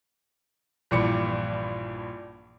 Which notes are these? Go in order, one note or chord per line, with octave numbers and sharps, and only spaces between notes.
A#1 G2 E3 D6 C#7